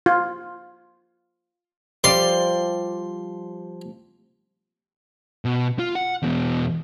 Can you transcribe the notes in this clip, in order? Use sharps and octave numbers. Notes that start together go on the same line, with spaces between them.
F4
F3 G3 D5 C6
B2
F4
F#5
E2 B2